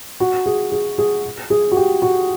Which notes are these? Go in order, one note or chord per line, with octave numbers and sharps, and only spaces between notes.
F#4
G#4
G#4
G#4
G#4
F#4
G4
F#4